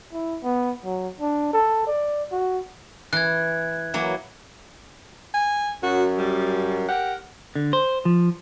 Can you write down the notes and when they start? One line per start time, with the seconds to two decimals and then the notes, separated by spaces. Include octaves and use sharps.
0.13 E4
0.43 B3
0.85 F#3
1.20 D4
1.53 A4
1.87 D5
2.32 F#4
3.13 E3 F#6 G#6
3.94 E3 F#3 A#3
5.34 G#5
5.83 F#2 F#4
6.18 G3
6.89 G4 A#4 F#5
7.56 D3
7.73 C5
8.05 F3